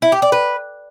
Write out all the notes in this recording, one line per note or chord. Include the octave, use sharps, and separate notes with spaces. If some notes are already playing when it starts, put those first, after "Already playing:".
E4
G4
D5
B4